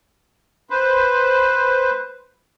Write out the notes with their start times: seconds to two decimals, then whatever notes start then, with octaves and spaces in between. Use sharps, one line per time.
0.70 B4 C5